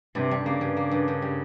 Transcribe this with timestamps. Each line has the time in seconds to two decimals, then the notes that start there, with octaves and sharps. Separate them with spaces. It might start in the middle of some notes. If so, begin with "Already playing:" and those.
0.15 G2 C3
0.31 G3
0.45 C#3 A#3
0.61 G2
0.77 A#3
0.91 G2
1.08 G2
1.22 G3